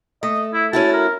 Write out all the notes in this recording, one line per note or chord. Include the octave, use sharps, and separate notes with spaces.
A3 D#5
E4
C#4 E4 F#4 A5
A#4